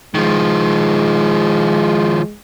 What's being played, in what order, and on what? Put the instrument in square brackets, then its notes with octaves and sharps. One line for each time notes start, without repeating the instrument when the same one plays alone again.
[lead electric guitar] D#3 F3 [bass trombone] G#3